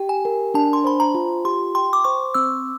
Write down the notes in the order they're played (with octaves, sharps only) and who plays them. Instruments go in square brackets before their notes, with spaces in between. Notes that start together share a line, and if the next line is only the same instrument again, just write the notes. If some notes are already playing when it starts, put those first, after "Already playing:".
Already playing: [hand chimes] G4 [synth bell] G5
[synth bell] G#5
[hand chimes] A#4
[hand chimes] D4 [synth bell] A5
[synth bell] C6
[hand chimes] C5 [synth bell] B5
[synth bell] A#5
[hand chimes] F4
[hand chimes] G4 [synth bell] C6
[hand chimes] G5 [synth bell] C6
[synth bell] D6
[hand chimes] C5 [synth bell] C#6
[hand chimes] C4 [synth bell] E6